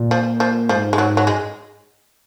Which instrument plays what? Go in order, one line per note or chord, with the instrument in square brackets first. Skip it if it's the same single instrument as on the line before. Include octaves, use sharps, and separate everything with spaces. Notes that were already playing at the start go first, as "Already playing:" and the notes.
Already playing: [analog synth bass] A#2
[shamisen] F3
F3
[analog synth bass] G#2 [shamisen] F3
[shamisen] G#3
F#3
F#3
G#3